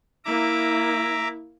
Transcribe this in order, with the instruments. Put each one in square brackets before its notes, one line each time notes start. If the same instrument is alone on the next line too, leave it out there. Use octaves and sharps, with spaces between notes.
[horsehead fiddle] A#3 E4 [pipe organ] E5 A#5 D6